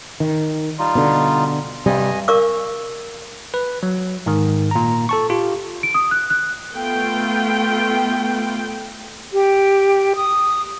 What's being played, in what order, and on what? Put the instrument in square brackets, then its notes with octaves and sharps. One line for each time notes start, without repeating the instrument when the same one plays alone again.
[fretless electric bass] D#3
[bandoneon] G3 D#4 F4
[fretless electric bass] B2 D3
[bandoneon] G2 D#5 G#5 [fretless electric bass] C3 G3
[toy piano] A#4 D5 F5 C#6 D6 E6
[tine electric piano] B4
F#3
G#2 D#3
A#2 A#5
A4 A5 C#6
F4 G4
[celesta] D7
D#6
F#6
F#6
[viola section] A3 B3 F4 G5
[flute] G4
D#6